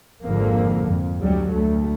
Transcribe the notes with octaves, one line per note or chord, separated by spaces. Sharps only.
G#1 F2 D3 F3 A#3
F2
D2 F#3 G3
D2 A3